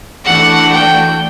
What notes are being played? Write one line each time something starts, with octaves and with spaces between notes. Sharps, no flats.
E3 A3 D4 F#4 F#5
G5